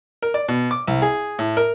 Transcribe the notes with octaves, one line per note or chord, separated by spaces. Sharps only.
A#4
D5
B2
D6
C2
G#4
A2
A#4